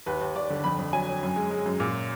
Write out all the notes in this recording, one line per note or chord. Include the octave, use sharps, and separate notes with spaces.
D#2 B4
D#2
D#2 D5
D3
F2 B5
F2
F#3 G#5
F#3
F#2
G#3
G#3
F#2
A#2